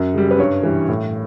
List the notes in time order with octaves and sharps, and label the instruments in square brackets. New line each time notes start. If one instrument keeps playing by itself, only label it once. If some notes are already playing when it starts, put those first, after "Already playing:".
Already playing: [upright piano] F#2
C#3 G3
B4
G2 C#5
E3 G3
A2